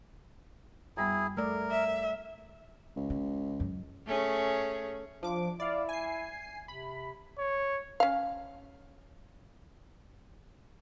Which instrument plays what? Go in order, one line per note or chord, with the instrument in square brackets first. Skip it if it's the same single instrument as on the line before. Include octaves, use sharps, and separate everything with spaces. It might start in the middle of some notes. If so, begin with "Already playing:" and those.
[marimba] F#2 G3 B3 [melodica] E4 G#4
[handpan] A3 D5 [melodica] A#4 [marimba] E6
[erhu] E5
[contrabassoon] C#2
[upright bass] C#3
F#2 C#3
[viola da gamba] A3 C#4 G#4
[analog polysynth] F3 D6 [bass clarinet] D4
[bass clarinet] E4 [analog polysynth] D5 F5
[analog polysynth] G#5 C7
[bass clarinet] C3 [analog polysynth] B5
[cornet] C#5
[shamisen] C#4 F5